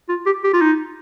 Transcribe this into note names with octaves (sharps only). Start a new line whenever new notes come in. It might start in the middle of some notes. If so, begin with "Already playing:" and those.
F4
G4
G4
F4
D#4